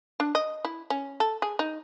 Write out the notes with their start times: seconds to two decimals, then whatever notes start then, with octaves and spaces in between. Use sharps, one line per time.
0.20 D4
0.35 D#5
0.65 E4
0.90 C#4
1.20 A4
1.42 G#4
1.59 D#4